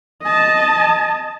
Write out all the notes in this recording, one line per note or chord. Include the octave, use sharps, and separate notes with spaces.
D#5 A5